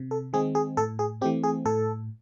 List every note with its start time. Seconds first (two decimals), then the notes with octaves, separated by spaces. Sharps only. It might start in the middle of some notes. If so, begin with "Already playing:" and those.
Already playing: C3
0.11 A4
0.33 D#3 G#3 C4 G#4
0.55 G#4
0.77 A2 A4
0.99 G#4
1.21 E3 A3 C4 G4
1.43 G#4
1.65 A2 A4